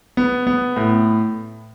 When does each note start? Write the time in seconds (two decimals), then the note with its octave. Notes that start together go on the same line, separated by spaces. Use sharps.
0.17 B3
0.47 B3
0.76 A2